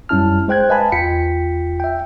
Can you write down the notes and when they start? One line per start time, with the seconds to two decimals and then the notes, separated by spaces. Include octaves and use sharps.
0.09 F#2 G3 C#4 E4 A5 F6
0.48 G#3 C5 G5 F#6 G#6
0.69 B4 D#5 F5 G#5 A5 B5
0.92 E2 F4 G5 B6 C#7
1.80 E5 G5